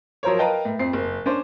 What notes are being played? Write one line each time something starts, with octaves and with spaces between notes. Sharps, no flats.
F3 F#3 A#4 C5 C#5
A#4 B4 D#5 F5 G5 A5
A2
F2 C4 C7
F#1
C#4 D4 C5